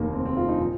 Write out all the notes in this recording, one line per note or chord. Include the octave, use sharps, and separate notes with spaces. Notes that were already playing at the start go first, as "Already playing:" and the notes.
Already playing: F1 D#2 D#3 A#3
C4
C4
F4
D#4
A#2 F3